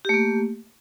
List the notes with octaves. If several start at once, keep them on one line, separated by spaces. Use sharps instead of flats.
A3 A#3 G4